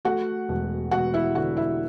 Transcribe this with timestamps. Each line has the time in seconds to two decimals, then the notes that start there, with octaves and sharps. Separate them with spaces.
0.05 A3 F#4 F#5
0.49 E1
0.91 E1 F#4 F#5
1.14 E4 E5
1.35 D3 F#4 F#5
1.57 E4 E5